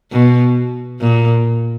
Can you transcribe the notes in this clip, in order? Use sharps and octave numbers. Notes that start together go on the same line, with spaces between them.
B2
A#2